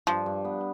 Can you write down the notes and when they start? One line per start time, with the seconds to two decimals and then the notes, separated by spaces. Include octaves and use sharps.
0.07 G2 F3
0.26 G2
0.45 B3